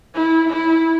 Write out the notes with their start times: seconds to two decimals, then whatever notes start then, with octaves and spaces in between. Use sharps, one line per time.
0.14 E4
0.49 E4